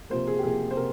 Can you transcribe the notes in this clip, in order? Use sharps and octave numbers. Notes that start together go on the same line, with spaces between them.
C3 F3 A#3 C5
G#4
G4
C3 F3 A#3 G#4
C5
C3 A#4